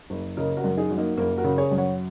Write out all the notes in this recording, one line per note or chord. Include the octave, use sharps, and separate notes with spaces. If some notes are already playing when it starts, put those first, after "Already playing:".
F#1
C#3 A#4 D#5
F#4 A#4
F#2
D#4 G#4
F#3
A#3 D#4
F#1 A#3
F#4 A#4
C#3
G#4 C#5
F#2
C#5 F#5